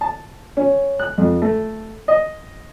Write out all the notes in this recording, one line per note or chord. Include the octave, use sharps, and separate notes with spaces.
A5
C#4
F#6
F2
A3
D#5